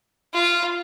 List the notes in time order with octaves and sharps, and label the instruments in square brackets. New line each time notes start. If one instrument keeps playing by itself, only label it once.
[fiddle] F4